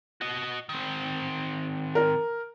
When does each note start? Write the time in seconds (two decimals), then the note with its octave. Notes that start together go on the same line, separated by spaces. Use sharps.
0.21 F#4 D#5
0.69 D#3 C4
1.95 A#4